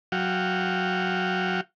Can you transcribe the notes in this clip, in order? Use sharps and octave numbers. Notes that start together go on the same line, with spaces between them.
F#3 F#4 F5 G5